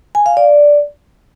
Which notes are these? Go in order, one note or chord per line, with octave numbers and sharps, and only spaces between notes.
G#5
F5
D5